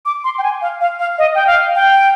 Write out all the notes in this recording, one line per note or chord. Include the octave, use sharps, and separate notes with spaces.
D6
C6
G5
G#5
F5
F5
F5
D#5
G5
F5
G5